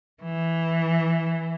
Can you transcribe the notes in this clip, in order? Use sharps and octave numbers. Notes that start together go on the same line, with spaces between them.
E3